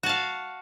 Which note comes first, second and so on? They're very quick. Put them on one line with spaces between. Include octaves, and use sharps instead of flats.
F#4 A5 F5